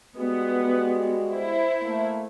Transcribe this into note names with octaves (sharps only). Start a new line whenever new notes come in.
G3 G#3 B3 F#4
E4 C5
A3 A#3